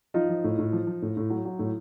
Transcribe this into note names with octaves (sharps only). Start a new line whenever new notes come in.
F3 D#4 F4
F3
A2
A2
F3
F3
A2
A2
F#3
F#3
A2